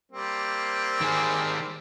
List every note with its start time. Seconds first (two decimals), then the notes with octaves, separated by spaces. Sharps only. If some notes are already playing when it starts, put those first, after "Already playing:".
0.12 G3 A#3 C4
1.01 D#3 G#4